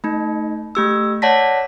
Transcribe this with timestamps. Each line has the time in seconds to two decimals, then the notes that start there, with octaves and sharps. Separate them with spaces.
0.04 A3 D#4
0.75 A3 G4 E6
1.22 C#5 D5 F#5 A5 A#6 B6